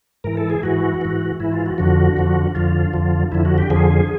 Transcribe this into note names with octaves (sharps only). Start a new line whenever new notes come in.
G#2 E3 A#4
A4
G#4
G#2 E3 F#4
G#2 E3
G#2 E3 E4
F4
F#4
F2 D3 F3 F#4
F2 D3 F3
F2 D3 F3 F4
F2 D3 F3
F2 D3 F3 E4
F#4
G4
F2 D3 F3 G#4